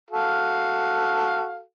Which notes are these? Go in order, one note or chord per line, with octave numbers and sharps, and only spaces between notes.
F#4 A4 F5